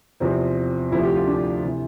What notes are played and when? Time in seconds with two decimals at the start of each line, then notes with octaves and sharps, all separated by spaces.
0.20 E2 C3 F3 C4
0.91 D2 C3 F3 E4
1.03 G4
1.15 F4
1.27 D4
1.63 C3 E3